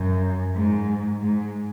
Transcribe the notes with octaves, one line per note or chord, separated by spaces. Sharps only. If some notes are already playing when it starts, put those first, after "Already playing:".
Already playing: F#2
G#2
G#2